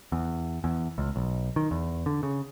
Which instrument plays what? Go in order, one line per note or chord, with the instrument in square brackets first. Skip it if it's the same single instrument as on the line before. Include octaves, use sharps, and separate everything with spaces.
[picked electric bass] E2
E2
C#2
B1
D#3
E2
D3
C#3